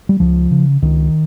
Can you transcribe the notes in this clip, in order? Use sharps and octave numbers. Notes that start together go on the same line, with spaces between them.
G3
C#2 F3
C#3
C#2 D#3